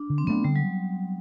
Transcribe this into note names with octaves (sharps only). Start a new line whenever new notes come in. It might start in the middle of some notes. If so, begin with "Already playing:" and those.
Already playing: D4
D3
C4
F#3 A3 B3 D4
D3 G3
F#3